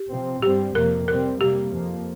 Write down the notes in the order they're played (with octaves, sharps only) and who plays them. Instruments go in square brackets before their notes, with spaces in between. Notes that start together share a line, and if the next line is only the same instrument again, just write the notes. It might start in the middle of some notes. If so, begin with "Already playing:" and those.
Already playing: [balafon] G4
[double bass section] C3 F3 C4
[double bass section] G2 G3 C4 [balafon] G4
[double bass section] F2 C3 F3 A#3 [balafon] A#4
[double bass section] C3 G3 C4 [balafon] A#4
[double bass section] C3 G3 A#3 [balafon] G4
[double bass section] F2 F3 A#3